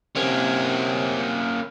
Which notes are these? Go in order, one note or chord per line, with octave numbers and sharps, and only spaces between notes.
C3 A#3 C#4